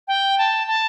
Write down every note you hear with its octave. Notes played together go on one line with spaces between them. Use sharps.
G5
A5
A5